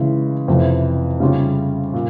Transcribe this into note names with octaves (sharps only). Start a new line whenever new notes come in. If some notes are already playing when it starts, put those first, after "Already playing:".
Already playing: C#3 E3 G#3 E4
F2 C3 E3
C#3 G3 C#4 F4
A#2